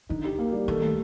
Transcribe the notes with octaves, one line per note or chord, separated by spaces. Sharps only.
D3 D#4
G4
A#3
G3
D#3 A4
A3